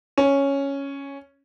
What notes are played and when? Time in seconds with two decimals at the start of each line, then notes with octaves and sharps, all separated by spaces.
0.18 C#4